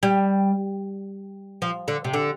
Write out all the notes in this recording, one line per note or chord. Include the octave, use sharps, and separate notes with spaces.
G3
F3
D3
C3
D3